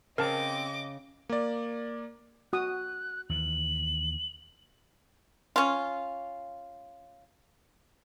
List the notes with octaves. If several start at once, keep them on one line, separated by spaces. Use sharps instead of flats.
C#3 C4 A#4 D#5 A5 D6
A#3 D5
F#4 D#6 F#6
D#2 E3 F#7
C#4 F4